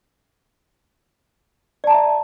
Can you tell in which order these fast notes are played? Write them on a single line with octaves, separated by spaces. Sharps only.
D5 A5 A#5 E5